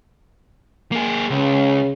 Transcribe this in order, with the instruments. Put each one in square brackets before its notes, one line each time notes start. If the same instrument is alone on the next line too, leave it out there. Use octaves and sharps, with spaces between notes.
[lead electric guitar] A#3 G#4
[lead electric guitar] C#2 [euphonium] C#3